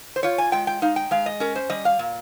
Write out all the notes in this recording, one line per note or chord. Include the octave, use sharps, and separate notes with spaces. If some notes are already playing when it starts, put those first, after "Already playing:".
C5
F4 C#5
G#5
G#3 G5
G5
D#4 F5
G5
G#3 F5
D#5
C#4 A#4
C5
G3 D#5
F5
A#2